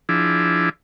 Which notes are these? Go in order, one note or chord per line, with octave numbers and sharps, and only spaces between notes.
F3 D4 E4 G#4